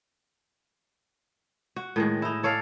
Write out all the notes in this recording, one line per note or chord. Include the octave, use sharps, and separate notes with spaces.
F#4
A2 D#3 G#3
D#4 E4
A4 C#5 D5 F5